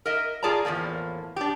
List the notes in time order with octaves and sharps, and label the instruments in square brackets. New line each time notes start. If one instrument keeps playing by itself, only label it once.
[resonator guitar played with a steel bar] A#4 D#5 E5
F4 G#4 D5 A5 A#5
E2 A2 F3 A#3
D4 G4